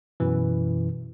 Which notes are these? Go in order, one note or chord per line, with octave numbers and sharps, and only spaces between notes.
F#2 B2 E3